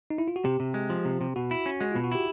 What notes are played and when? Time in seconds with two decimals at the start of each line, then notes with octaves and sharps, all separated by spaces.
0.10 D#4
0.18 E4
0.28 F4
0.36 F#4
0.45 C3 G4
0.60 C3
0.74 G#3
0.90 F3
1.05 C3
1.21 C3
1.36 B2 F#4
1.51 E4
1.66 C#4
1.81 G#3 F#4
1.92 B2 F4
2.04 F#4
2.12 E4 G4